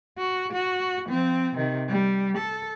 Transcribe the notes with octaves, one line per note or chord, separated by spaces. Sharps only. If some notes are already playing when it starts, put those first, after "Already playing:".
F#4
F#4
F3 C4
C3 D#3
G3
A4